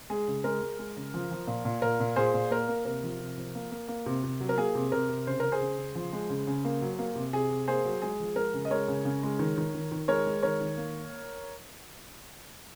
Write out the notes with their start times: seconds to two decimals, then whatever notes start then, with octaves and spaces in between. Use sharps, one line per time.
0.10 G#3 G#4
0.28 C#3
0.44 G#3 A#4
0.62 G#3
0.79 G#3
0.97 C#3
1.14 F3
1.31 F3
1.47 A#2
1.65 A#2
1.82 A#2 A#4
2.00 A#2
2.16 A#2 G#4 C5
2.34 A#2
2.51 A#3 A#4
2.69 A#3
2.85 C3 A#4
3.03 F3
3.20 C3
3.37 F3
3.55 A#3
3.72 A#3
3.88 A#3
4.06 C3
4.24 C3
4.41 F#3
4.49 A#4
4.57 A#3 G#4
4.75 C3
4.92 C3 A#4
5.09 C3
5.27 C#3 C5
5.40 C#3 A#4
5.52 G#4 C5
5.61 C#3
5.78 C#3
5.95 F3
6.13 G#3
6.30 C#3
6.47 C#3
6.65 A#3
6.82 F#3
6.99 A#3
7.15 C3
7.33 C3 G#4
7.50 C3
7.68 A#3 G#4 C5
7.85 F#3
8.02 G#3 G#4
8.20 F3
8.36 G#3 A#4
8.54 C#3
8.65 D#5
8.71 G#3 A#4 C#5
8.88 C#3
9.05 C#3
9.23 G#3
9.39 D#3
9.58 D#3
9.74 D#3
9.91 D#3
10.08 G#3 A#4 C#5
10.26 G#3
10.43 D#3 A#4 C#5
10.60 D#3
10.77 A#3